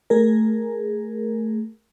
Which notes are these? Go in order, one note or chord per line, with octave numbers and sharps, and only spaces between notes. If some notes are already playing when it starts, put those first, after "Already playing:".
A3 G#4 A#4